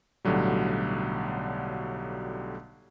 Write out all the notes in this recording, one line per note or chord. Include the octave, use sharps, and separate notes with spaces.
B1 A2 D3 F#3 G3